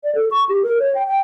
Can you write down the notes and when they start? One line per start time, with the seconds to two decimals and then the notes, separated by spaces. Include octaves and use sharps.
0.04 D5
0.15 A4
0.31 C#6
0.49 G4
0.63 A#4
0.79 C#5
0.95 G5
1.07 G5